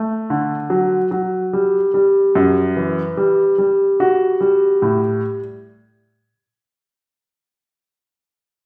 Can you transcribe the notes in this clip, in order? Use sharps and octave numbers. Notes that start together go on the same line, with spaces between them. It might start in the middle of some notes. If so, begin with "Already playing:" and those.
Already playing: A3
D3
F#3
F#3
G3
G3
F#2
E3
G3
G3
F#4
G3
A2